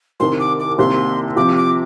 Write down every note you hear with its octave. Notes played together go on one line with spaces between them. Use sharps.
C2 C3 D#3 C6
D6
D6
C2 C3 D#3 A#3 C6
C3 F3 C4 G4 D6
D6